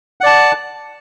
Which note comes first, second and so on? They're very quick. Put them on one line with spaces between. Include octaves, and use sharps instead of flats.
F#5 D5 A5